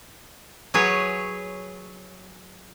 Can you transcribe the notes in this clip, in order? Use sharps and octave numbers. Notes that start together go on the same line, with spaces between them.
F#3 G#4 B4 C#5